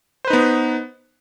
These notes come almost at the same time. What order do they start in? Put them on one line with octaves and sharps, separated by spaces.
C5 B4 D#4 B3